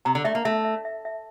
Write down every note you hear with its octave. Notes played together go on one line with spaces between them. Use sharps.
C3 A#5
D3
A3 E5
A#3
A3 E5
E5
E5
E5